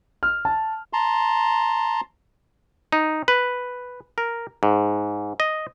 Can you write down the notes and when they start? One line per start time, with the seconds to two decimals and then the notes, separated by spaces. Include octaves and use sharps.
0.23 F6
0.45 A5
0.93 A5 A#5 C6
2.93 D#4
3.28 B4
4.18 A#4
4.63 G#2
5.40 D#5